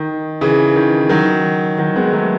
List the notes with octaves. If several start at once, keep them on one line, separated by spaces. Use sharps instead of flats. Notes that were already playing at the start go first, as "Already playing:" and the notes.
Already playing: D#3
C#3 E3
D#3
D#3 F#3
D#3 F#3
G#3 B3
F#3 A3